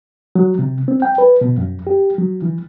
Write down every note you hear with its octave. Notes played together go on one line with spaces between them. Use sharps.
F#3
C3
C4
G5
B4
B2
F#2
G4
F#3
E3